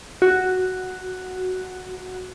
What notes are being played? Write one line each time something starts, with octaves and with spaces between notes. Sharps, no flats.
F#4